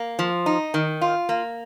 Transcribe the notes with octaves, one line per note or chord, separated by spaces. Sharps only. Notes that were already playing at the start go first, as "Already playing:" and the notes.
Already playing: A#3
F3
D#4
D#3
F4
A#3